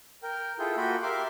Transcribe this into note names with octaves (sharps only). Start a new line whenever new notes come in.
A#4 G5
E4 F4 G#4 A4 G5
A#3 F4 F#4 G5 B5
G4 A#4 E5 C6 D6